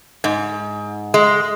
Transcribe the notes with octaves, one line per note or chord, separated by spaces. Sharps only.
G#2
G#3